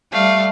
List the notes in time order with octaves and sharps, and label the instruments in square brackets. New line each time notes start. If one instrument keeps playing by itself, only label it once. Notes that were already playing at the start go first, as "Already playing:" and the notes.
[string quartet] G3 A3 [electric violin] F5